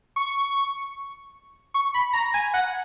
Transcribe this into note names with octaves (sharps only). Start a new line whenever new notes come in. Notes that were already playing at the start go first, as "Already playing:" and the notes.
C#6
C#6
B5
A#5
G#5
F#5